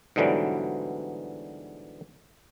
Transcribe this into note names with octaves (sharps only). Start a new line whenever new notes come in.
G#2 B2 D3 E3 F#3 G3